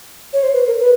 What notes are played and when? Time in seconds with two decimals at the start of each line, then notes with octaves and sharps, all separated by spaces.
0.33 C#5
0.43 C5
0.54 B4
0.67 A#4
0.79 B4